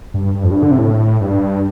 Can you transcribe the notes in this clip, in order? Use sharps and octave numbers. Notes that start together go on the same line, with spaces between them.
G2
G2
F2
G2
D3
C3
A2
G2